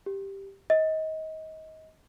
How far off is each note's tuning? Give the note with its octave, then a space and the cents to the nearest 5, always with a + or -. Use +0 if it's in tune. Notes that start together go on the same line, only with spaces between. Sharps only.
G4 +0
D#5 +25